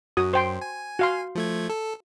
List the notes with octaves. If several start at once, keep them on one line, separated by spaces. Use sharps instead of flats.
F#2 F#4 D#6
C5 G5 C6
G#5
F#4 F5 C6
F3 A3 G#6
A4